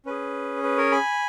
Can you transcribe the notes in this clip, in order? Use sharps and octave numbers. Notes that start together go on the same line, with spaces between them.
C#4 G#4 B4
B4
A#4 C#5
G#5 B5